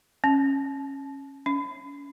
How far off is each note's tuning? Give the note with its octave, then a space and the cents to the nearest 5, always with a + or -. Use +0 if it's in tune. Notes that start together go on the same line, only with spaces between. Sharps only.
C#4 -20
C#4 +30